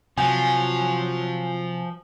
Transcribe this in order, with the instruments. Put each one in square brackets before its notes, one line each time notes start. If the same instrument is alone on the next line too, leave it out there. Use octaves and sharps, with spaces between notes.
[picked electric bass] C3 [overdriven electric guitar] F3 [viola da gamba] F#3 [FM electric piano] G#5 G6